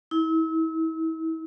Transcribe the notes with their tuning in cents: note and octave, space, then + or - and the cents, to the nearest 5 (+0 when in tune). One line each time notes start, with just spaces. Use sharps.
E4 -35